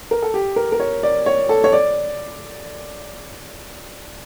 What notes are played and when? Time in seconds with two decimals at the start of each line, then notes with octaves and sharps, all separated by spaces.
0.11 A#4
0.22 A4
0.34 G4
0.56 A#4
0.72 A#4
0.80 C#5
1.03 D5
1.26 C#5
1.49 A4
1.64 C#5
1.73 D5